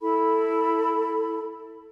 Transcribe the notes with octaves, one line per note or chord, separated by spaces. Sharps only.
E4 A4 B5